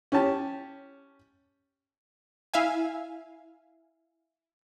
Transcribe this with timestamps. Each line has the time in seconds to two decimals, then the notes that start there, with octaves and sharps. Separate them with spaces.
0.12 C#4 G4 A5
2.54 E4 E5 F5 G#5